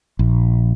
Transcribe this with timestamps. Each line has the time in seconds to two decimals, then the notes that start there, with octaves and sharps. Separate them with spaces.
0.19 A#1